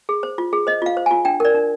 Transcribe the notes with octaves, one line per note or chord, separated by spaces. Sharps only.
G#4
C5
F4
G#4
C5 D#5
F4 F5
C5
G#5
F4
D4 G5
A#4 D5
D4